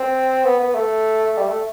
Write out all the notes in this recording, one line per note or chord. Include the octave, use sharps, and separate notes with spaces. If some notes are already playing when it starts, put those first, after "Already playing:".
Already playing: C4
B3
B3
A3
G3
A3